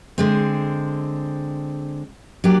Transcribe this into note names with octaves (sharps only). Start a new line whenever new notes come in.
D3 G#3 C4
F#3 A#3 D4 G4